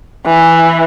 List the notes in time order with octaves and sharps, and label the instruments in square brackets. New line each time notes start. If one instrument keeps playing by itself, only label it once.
[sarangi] E3